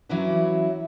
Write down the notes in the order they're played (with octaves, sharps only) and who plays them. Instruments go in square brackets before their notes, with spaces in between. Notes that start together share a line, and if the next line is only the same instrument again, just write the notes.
[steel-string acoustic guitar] E3 F#3 C#4 E4 F#4 B4